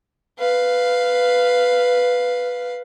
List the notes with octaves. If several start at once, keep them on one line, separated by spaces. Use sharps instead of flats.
B4 F5